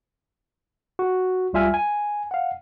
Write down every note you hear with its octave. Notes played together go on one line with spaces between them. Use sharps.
F#4
C#2 G3 F4 E5 G#5 F6
G#5
F5 F#5